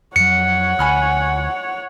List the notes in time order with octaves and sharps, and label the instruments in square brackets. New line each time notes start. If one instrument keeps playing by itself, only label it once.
[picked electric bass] F2 F#3 [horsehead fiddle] C#5 F#5 [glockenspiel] C#7
[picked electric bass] D2 [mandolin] G#5 B5 F6